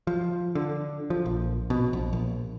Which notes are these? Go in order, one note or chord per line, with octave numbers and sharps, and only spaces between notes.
F3
D3
F3
A#1
B2
A#1
A#1